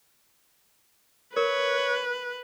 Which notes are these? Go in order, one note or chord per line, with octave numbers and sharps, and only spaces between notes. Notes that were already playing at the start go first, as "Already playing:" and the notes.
A#4 B4 C#5